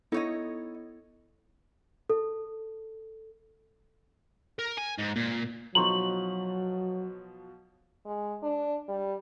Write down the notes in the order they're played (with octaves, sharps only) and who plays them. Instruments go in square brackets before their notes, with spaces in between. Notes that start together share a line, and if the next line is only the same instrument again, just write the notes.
[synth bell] B3 E4 A4 [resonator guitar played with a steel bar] D#4 C#5 D#5
[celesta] A4
[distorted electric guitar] A#4
G#5
G#2
A#2
[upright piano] B2 F3 D#4 [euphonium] F#3 [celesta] A#5 C6 C#6 [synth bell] F#7
[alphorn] G#3
D4
G3